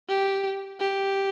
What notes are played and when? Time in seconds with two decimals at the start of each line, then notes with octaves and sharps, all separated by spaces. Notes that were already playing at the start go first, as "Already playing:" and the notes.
0.09 G4
0.80 G4